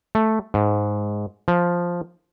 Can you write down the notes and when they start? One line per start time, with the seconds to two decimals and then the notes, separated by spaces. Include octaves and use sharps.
0.15 A3
0.54 G#2
1.48 F3